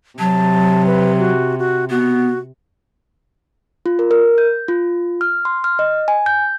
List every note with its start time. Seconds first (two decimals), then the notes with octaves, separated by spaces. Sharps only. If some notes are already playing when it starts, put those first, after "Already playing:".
0.19 C3 F#3 A5
0.86 B4
1.18 F#4
1.59 F#4
1.90 B3 F#4
3.86 F4
3.99 A#4
4.11 A#4
4.38 G6
4.68 F4
5.21 F6
5.45 C6
5.64 F6
5.79 D#5
6.08 G#5
6.26 G6